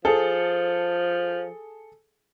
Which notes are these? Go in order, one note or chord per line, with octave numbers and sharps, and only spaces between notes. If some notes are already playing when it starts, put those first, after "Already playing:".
F3 G#4 A4